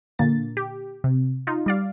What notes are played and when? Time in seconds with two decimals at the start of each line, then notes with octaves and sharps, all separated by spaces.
0.19 A#2 D3 A#3 A6
0.57 G4
1.04 C3
1.47 D#4 F4
1.66 G3 D5 F5